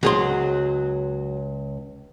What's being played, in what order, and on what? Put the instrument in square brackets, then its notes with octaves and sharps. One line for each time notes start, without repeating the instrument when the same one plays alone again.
[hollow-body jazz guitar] C#2 G#4 C6 [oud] F#3